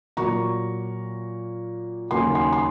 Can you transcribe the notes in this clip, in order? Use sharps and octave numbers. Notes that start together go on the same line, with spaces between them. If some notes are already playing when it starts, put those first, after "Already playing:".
A#2 F#3 A#3 A#5 C#6
D#2 C#3 F#3 A#3 G#5 C6
G#5 C6
C6